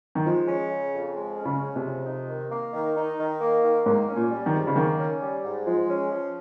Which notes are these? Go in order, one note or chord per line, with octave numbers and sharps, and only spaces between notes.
D#3
F3 G#3
C#4
C#3
F2
G#3
C#4
C#3
C#3
C3
F2
D#4
D#3
A#3
D#3
D#4
D#3
A#3
D#3
G#2 A#3
C#4
A#2
G3
D#3
G#2
C#3
D#3 A#3
C#4
G3
G#2
F3 G#3
C#4
F3